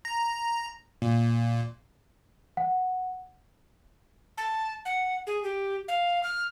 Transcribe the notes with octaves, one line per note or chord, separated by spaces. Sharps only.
A#5
A#2
F#5
A5
F#5
G#4
G4
F5
F6